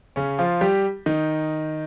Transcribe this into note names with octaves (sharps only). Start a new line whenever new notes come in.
C#3 C#4
F3 F4
G3 G4
D#3 D#4